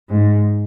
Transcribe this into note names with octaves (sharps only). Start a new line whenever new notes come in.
G#2